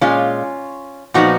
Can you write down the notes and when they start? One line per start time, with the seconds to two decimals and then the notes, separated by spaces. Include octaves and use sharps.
0.01 A#2 G#3 C#4 F4
1.14 A#2 F3 B3 D#4 F#4